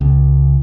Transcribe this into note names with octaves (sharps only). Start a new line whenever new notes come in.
C#2